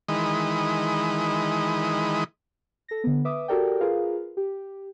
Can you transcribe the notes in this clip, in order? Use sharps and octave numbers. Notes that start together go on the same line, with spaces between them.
D#3 E3 G#3 D#5 B5
A4 A#6
D3 B3
B4 E5 D6 D#6
F#4 G4 A4 A#4 D5 G5
F4 G#4 A#4 B4 F5
G4